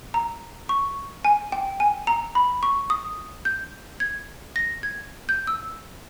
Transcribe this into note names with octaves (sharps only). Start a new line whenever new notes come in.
A#5
C#6
G#5
G5
G#5
A#5
B5
C#6
D#6
G6
G#6
A#6
G#6
G6
E6